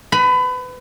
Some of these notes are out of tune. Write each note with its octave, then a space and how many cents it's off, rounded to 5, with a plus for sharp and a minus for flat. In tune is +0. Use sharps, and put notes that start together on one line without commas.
B4 +30 B5 -10